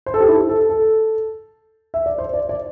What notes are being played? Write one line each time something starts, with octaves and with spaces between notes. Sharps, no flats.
C5
A4
G4
E4
A4
A4
E5
D5
C5
D5
D5